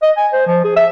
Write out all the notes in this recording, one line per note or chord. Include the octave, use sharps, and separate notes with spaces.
D#5
G#5
C5
F3
G#4
E5